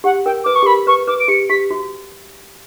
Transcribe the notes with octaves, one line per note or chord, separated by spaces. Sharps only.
G4 F#5
A#4 G5
B4 D6
C#6
G4
A#4 B5
B4 C#6
B4 D6
D7
G4 C#7
G4 B6
F#4